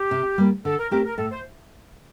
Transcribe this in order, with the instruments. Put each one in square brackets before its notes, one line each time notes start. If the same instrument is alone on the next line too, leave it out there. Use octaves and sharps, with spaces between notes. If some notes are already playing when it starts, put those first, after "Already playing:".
Already playing: [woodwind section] G4
[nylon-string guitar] C3
G3 A#3
[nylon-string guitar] D3 [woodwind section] A4
[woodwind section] A#4
[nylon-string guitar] A3 C4 G4 [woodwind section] A#4
[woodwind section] A#4
[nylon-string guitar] A2 [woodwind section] A4
[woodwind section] C5